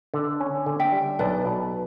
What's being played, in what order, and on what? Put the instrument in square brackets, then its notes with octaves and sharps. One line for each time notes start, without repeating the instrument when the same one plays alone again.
[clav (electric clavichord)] D3
C#4
D3
[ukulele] E5 G5
[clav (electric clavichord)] G3
[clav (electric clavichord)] B1 [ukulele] B4 D5
[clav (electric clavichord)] B2